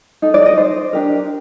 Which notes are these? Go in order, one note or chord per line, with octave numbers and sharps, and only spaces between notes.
D#4 A4
D5
D#5
C5
D4 G4 A#4